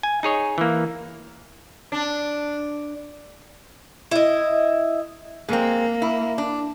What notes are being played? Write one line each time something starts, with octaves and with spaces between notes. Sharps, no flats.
G#5
D#4 G#4 C#5 D#5
E3 A#3
D4
E4 D#5
G#3 A#3 C4
E4
D4